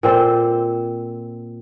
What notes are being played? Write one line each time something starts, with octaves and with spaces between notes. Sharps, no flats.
A#2 C4 A4 C5